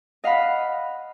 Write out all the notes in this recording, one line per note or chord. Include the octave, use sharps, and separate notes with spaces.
D#5 F5 F#5 B5